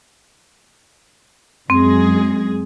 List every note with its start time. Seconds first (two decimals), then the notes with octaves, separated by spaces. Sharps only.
1.70 F#2 G#3 C4 G#4